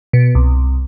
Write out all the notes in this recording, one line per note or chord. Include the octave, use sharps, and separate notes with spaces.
B2
C2